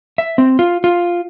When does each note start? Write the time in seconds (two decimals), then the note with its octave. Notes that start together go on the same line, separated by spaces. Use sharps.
0.18 E5
0.38 C4
0.59 F4
0.84 F4